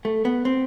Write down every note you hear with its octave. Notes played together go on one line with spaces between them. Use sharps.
A3
B3
C4